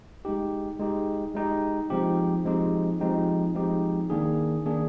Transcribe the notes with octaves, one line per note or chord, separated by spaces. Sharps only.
G#3 D#4 G4
G#3 D#4 G4
G#3 D#4 G4
F3 G#3 C4 D#4 G4
F3 G#3 C4 D#4 G4
F3 G#3 C4 D#4 G4
F3 G#3 C4 D#4 G4
D#3 A#3 D4 G#4
D#3 A#3 D4 G#4